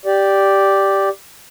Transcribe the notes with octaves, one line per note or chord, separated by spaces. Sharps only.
G4 D5